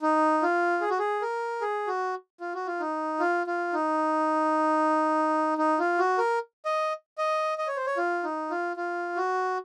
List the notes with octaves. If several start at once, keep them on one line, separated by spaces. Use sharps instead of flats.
D#4
F4
G#4
F#4
G#4
A#4
G#4
F#4
F4
F#4
F4
D#4
F4
F4
D#4
D#4
F4
F#4
A#4
D#5
D#5
D#5
C#5
C5
C#5
F4
D#4
F4
F4
F#4